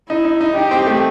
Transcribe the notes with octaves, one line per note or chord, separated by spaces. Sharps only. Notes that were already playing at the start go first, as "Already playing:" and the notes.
D#4 E4
D#4
D#4
D#4 G4
C4
A3